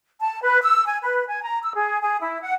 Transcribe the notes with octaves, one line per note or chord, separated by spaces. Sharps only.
A5
B4
E6
G#5
B4
G#5
A#5
E6
G#4
G#4
E4
F#5